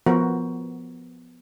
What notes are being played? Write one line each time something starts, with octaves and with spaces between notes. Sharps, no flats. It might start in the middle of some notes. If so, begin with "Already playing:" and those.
F3 B3 F#4 A#4 C5